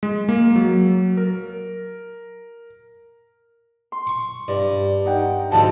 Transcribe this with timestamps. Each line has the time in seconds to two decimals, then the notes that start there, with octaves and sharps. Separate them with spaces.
0.03 G#3
0.29 A#3
0.56 F#3
1.17 A#4
3.92 C6
4.07 C#6
4.48 G2 D5
5.05 D#4 F#5 G5
5.52 D2 G#2 F3 A5